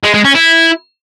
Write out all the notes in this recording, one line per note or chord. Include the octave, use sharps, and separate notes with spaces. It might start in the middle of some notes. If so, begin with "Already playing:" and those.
G#3
G#3
C#4
E4